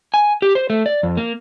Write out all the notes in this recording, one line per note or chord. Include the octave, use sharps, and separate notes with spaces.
G#5
G4
C5
A3
D5
F2
A#3